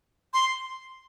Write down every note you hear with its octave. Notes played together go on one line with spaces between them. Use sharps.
C6